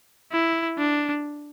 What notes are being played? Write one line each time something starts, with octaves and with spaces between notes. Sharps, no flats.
E4
D4